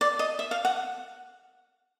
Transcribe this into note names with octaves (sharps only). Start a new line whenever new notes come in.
D5
D#5
E5
F5
F#5